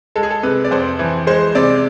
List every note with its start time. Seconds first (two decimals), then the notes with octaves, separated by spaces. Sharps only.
0.16 G#3 A4
0.23 G#4
0.30 A4
0.43 C3 B4
0.64 D5
0.71 F2 C5
0.99 E3
1.27 G#3 C5
1.55 C3 D5